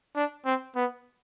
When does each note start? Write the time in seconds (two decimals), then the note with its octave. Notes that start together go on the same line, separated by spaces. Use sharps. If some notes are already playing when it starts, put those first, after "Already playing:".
0.16 D4
0.45 C4
0.76 B3